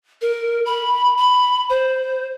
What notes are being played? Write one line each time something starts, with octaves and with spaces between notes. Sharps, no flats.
A#4
B5
B5
C5